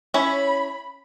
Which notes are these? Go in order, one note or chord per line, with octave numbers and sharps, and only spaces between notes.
C#4 E4 C#5 B5